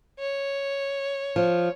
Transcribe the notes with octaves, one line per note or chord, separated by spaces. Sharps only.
C#5
F3